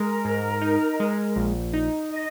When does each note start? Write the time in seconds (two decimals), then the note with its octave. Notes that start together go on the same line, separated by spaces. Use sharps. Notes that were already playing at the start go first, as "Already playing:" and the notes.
Already playing: G#3 A#4
0.25 G#2
0.61 D#4
1.00 G#3
1.36 A#1
1.74 D#4
2.11 D#5